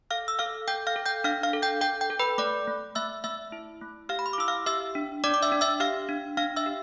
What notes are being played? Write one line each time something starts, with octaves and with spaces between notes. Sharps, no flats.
A4 F5 F6
E6
A4 F5 F6
A4 G5 G6
F5 F6
A4
G5 G6
D4 F5 F6
F5 F6
A4
G5 G6
A4 G5 G6
G5 G6
A4
B4 B5
A3 D5 D6
A3
A3 E5 E6
A3 E5 E6
E4
A3
G4 F5 F6
B5
C6
D6
E4 E6
F5 F6
G4 E5 E6
D4
D4 D5 D6
D6
E5 E6
D4
E5 E6
G4 F5 F6
D4
D4 F5 F6
E5 E6
G4